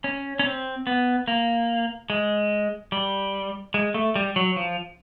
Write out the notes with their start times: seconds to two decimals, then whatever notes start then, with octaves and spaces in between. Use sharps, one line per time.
0.04 C#4
0.39 C#4
0.46 C4
0.87 B3
1.28 A#3
2.10 G#3
2.92 G3
3.74 G#3
3.94 A3
4.16 G3
4.36 F#3
4.56 F3